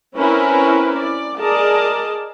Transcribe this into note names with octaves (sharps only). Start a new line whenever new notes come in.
C4 C#4 E4 A#4 B4
D5
G#4 A#4 D5 D#5 A5